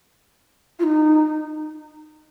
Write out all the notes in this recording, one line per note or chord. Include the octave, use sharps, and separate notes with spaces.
F4
D#4